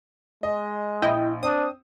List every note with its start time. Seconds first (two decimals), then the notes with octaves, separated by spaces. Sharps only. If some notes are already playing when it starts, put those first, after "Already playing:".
0.43 G#3 D#5
1.02 A#1 E4 D#5 G5
1.43 C4 D4 D#6